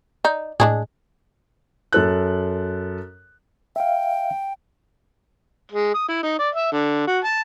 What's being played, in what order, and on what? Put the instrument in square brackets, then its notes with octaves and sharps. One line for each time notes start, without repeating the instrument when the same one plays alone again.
[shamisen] D#4 [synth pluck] D5
[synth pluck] A2 [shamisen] G#3 D4 G#4
[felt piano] F#2 A4 F#6
[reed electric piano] E5 F5 [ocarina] G5
[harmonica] G#3
D#6
E4
D#4
D5
E5
D3
F#4
A5